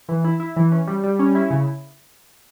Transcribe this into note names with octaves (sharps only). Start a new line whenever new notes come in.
E3
E4
E4
E3
C#4
G3
G3
C#4
E4
C#3